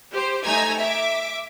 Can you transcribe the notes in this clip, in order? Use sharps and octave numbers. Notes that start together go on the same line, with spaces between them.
G4 C5
A3 D#4 G#5 A#5 E6 G#6
E5 D6